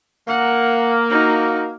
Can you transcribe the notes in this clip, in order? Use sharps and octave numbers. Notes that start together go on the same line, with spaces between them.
A#3 F#5
D#4 F#4